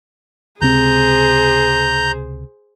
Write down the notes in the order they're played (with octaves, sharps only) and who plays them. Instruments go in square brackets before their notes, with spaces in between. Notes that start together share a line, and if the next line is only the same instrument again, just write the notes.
[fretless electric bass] C#2 C3 C4 [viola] G#4 C5 [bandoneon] A#5 G6